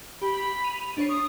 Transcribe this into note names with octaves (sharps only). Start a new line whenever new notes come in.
G4 B5
D#7 F7
D4 C#5 C7
C#6 D#6